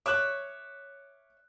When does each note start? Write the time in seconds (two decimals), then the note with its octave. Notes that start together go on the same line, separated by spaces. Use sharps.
0.06 C#5 E5 D6 F#6